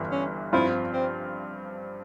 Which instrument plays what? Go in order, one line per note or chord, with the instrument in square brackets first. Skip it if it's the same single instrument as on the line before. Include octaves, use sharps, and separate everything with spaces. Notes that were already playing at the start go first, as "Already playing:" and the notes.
Already playing: [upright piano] G1 G2 E3
[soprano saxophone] C#4
[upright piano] G2 F3 C4 F4 [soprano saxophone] E4
[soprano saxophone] C4